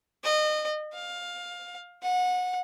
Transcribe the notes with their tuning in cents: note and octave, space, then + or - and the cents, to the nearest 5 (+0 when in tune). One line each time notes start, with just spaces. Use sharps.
D#5 -30
F5 +15
F#5 -25